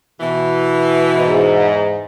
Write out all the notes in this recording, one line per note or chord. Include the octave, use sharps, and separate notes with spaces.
B2 E3
E2 G#2